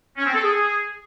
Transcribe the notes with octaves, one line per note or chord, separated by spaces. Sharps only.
C#4
C4
A4
G#4